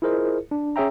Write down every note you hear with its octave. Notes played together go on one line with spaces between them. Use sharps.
E4 F4 G#4 A#4 C5 D#5
D4
C#4 G#4 C#5 E5 G5 A#5